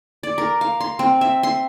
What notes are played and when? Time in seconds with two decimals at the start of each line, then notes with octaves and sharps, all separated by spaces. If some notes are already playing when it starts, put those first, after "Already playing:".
0.23 D5
0.38 A#4
0.61 F5
0.80 C6
0.99 C4
1.21 E5
1.43 C6